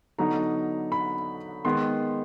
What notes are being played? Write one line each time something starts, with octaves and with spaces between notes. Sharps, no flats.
D3 F#3 B3 D#4 A#5
B5
D#3 G#3 B3 C6